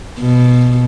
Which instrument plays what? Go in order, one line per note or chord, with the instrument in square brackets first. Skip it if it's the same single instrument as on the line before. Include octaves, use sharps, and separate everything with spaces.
[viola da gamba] B2